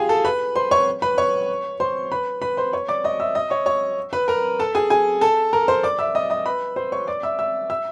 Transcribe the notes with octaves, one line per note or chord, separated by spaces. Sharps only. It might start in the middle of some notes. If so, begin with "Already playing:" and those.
Already playing: F4 G4 G#4 F5 G5 G#5
A4 A5
B4 B5
C5 C6
C#5 C#6
B4 B5
C#5 C#6
C5 C6
B4 B5
B4 B5
C5 C6
C#5 C#6
D5 D6
D#5 D#6
E5 E6
D#5 D#6
C#5 C#6
C#5 C#6
B4 B5
A#4 A#5
A4 A5
G#4 G#5
G#4 G#5
A4 A5
A#4 A#5
C5 C6
D5 D6
E5 E6
D#5 D#6
D#5 D#6
B4 B5
C5 C6
C#5 C#6
D5 D6
E5 E6
E5 E6
E5 E6